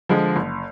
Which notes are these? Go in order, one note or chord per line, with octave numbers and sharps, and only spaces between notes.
D3 F3 G#3
F#1